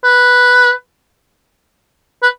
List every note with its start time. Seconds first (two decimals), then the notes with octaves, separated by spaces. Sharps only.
0.04 B4
2.23 B4